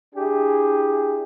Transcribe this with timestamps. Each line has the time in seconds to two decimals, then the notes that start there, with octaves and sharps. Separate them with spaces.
0.15 D4 E4 G4 G#4